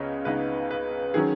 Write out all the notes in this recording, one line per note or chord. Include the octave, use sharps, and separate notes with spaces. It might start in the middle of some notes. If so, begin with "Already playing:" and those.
Already playing: C#2 C#3 B3 C#5 D#5
C#2 C#3 B3 D#4 B4
B4
D#3 F#3 C#4 G#4